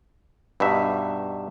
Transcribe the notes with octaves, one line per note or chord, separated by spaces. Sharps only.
G2 B2 D#4 E5